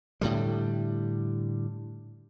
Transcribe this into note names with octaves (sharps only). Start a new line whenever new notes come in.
A2 D3 G3